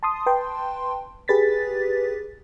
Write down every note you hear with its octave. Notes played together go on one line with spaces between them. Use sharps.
A5 C6 D#6
B4 G5 A5 C6
G4 G#4 B4 A6 B6